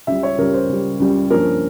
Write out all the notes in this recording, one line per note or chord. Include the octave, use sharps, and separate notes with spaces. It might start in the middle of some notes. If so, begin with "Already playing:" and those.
C#2 C#3 G3 E5
C#5
C#2 C#3 G3 A#4
C5
C#2 C#3 G3
C#2 C#3 G3
G2 F3 A#3 C#4 A#4